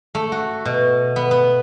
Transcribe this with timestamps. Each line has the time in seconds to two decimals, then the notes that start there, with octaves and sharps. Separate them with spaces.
0.15 A3
0.32 F#4
0.65 B2
1.16 B3
1.31 B3